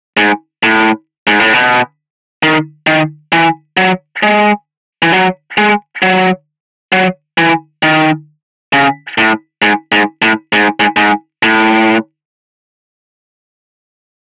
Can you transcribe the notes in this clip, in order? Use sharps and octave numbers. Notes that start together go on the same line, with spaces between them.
G#2
A2
G#2
A2
B2
D#3
D#3
E3
F#3
G#3
E3
F#3
G#3
F#3
F#3
E3
D#3
C#3
A2
G#2
G#2
A2
G#2
G#2
G#2
A2